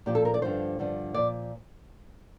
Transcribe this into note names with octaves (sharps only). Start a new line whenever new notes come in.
A#2 F3 G4
A4
A#4
D5
G2 D3 F3 C5
G2 D3 F3
A#2 F3 D5